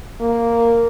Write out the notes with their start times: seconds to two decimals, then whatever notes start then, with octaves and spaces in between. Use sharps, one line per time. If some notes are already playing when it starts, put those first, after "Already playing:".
0.20 A#3